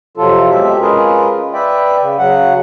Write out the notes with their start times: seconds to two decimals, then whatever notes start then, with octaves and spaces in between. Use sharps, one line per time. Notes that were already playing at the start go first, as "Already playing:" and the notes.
0.17 F2 C3 F#3 F4 A4
0.50 B2 G#3 C4 G4 E5
0.81 G#3 C#4 F4 G#4 A#4 B4
1.53 B4 D5 E5 G5
2.00 C#3
2.18 C#3 F#3 F#5